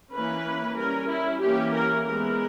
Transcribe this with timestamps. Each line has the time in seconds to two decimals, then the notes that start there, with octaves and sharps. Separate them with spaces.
0.13 E3 A#3 C#4 B4
0.77 G3 C#4 A#4
1.09 E4
1.41 E3 A#3 C#4 G4
1.74 A#4
2.06 E3 G#3 B3 A#4